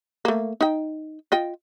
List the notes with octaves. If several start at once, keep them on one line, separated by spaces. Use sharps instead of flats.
A3 A#3
D#4 G5
F4 D#5 G5